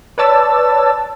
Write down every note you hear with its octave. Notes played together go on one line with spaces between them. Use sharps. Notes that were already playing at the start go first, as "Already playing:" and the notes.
B4 C#5 D5 A5 E6 A6